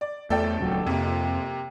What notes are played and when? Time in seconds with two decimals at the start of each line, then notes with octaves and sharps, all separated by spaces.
0.01 D5
0.30 E2 A3 A4 D5 G5
0.60 D#1 C#2 F#3
0.86 F2 C3 A#3